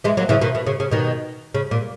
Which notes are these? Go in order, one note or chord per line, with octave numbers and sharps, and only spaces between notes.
E3 G#3
F#3 A#3
C#3 E3
B2 D#3
B2
C#3
C#3
B2 D#3
C#3
A#2